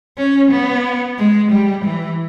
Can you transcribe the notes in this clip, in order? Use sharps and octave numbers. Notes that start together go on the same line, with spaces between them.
C#4
B3
G#3
G3
E3